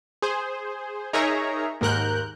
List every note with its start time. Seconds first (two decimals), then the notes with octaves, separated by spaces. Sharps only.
0.22 G#4 C5
1.13 D#4 G#4 A#4 C#5 E5 A#5
1.81 D#2 G#2 A#4 F#6 G6